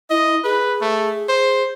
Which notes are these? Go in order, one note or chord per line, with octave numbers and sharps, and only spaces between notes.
E4 D#5
G#4 B4
A3
C5